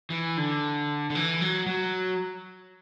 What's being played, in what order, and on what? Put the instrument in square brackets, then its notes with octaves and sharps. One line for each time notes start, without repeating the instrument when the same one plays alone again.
[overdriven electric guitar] E3
D3
D3
E3
F#3
F#3